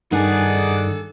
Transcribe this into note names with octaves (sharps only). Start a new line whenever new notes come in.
G2 D#3 D#4 G#4 A4 D5 F#5 G#5